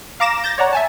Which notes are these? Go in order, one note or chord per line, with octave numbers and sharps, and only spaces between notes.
F5 A#5 D6 A#6 E7
G6 A6 A#6
C#5 D5 F#5 A#5
E5 G#5 A5